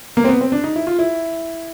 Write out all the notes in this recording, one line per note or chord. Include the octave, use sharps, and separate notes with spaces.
A#3
C4
B3
C4
D4
D#4
E4
F4
E4